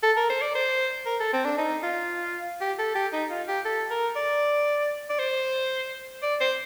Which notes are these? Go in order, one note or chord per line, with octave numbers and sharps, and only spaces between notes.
A4
A#4
C5
D5
C5
A#4
A4
C4
D4
D#4
F4
G4
A4
G4
D#4
F4
G4
A4
A#4
D5
D5
C5
D5
C5